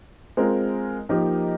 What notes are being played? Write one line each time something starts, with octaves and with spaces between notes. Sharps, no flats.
G#3 C4 F4 A#4
F3 A#3 D#4 G4 A#4